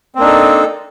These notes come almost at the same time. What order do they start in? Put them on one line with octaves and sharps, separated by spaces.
C4 A#3 D4 D#4 A4